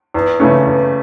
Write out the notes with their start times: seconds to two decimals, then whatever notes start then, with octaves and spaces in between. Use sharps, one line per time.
0.14 E2
0.40 C#3 E3 A3 C#4
0.66 E2